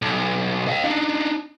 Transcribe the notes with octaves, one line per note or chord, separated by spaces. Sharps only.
B1
D#5 F5
D4 D#4